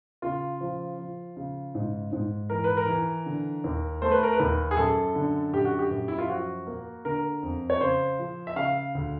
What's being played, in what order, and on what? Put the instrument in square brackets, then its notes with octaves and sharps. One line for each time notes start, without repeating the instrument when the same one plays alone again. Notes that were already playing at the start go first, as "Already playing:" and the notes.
[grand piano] C#3 F4
F3
F3
C#3
G#2
G#2
E3 A#4
B4
A#4
E3
D3
D#2
A3 C5
B4
A#4
B4
D#2
G#4
F#2 A4
D3
F#2 G4
F#4
G4
F#2
E4
F4
F3 F#4
A#3
D3 A#4
F2
C#5
C#3 C5
F3
E5
C#3 F5
D2